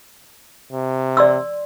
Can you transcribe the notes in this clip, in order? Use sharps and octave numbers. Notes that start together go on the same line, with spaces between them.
C3
D5 C6 E6